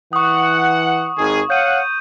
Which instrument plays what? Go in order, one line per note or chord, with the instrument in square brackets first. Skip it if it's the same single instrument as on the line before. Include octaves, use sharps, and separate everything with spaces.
[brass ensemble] E3 F#5 [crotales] C#6 D#6
[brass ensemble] G#1 D#3 G#4
[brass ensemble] C#5 F5 F#5 [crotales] G6 D#7